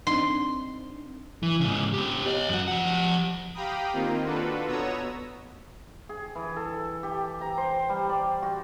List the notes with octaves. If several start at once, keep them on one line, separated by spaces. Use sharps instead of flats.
C4 D4 D#4 C6
E3
G#2 C#3
B3 G4
C#5 D#5
F#2 F#4
F3 F#5
G4 F5 G5 A#5 B5 D#6
D#3 A#3 C4 D#4 F4
D4 F4 F#4 A4 B4
B2 B3 C#5 A#5 D#6 E6
G#4
E3
A4
G4
A#5
C5
G3
D5
F#4